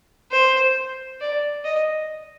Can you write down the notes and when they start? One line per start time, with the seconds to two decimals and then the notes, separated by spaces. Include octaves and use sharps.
0.31 C5
1.21 D5
1.65 D#5